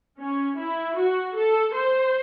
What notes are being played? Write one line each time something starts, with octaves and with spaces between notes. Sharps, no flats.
C#4
E4
F#4
A4
C5